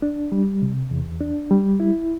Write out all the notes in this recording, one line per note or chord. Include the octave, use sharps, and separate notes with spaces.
D4
G3
C3
E2
D4
G3
E4